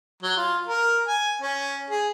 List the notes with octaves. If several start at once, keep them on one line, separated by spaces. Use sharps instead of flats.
F#3
F4
A#4
G#5
C#4
G#4